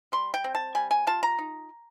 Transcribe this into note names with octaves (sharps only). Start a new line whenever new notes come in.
G3 C6
G5
C4
A5
G3 G#5
G#5
F4 A5
A#5
D#4